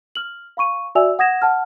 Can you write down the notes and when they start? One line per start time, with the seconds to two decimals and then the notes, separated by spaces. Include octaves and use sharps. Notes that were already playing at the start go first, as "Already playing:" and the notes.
0.15 F6 F#7
0.57 F5 B5 C#6 D#7
0.95 F#4 D5 E5 G#5 E6 F7
1.19 F#5 D#6 G#6 A#6 E7
1.42 F#5 A5 F6